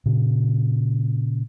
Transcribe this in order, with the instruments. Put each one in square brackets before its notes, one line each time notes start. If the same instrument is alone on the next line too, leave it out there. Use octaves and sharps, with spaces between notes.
[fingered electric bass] A#2 C#3